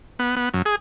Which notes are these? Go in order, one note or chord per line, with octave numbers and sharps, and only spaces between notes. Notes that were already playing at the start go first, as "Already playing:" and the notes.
B3
B3
F#2
G#4